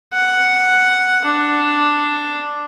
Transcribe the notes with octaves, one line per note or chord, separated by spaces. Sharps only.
F#5
D4